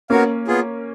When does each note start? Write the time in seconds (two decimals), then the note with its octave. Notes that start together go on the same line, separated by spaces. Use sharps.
0.10 A#3 B3 C#4 F#4 A#4 C#5 F5
0.47 B3 F4 G#4